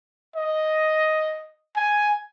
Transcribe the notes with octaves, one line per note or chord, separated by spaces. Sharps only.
D#5
G#5